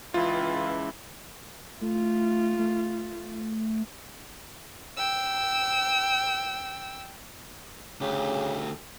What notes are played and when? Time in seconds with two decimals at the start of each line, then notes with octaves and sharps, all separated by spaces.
0.14 C#2 E3 F4
1.81 A3 F4
2.59 A3
4.97 G5 E6
8.01 D2 C#3 G4